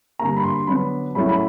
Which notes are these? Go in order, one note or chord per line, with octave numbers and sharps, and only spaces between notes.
G2 D3 G3 A#3 A#5
B5
C6
D3 F#3 B3 D4 B5
A2 F#3 A3 C#4 B5
B5